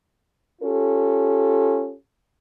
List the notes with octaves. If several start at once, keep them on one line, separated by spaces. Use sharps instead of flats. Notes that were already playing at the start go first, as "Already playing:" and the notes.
C#4 F4 G4 A4